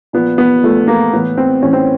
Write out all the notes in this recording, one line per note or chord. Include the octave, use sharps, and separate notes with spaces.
A#2 F3 B3
B3
A#2 F3 A3
A#3
A2 E3 B3
C4
A2 E3 C#4
C4